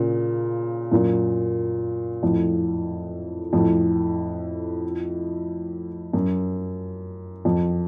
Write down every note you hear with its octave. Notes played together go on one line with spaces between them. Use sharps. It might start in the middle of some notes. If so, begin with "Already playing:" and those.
Already playing: A#2 C#3
F#2 A#2
F2 A2
F2 A2
F#2
F2